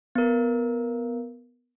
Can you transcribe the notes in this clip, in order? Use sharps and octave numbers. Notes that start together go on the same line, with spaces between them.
B3 A#4